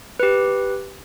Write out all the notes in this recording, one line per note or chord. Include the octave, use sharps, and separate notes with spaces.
G4 B4